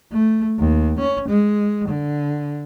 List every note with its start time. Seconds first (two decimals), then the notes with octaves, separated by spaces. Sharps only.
0.12 A3
0.59 D#2
1.00 C#4
1.29 G#3
1.89 D3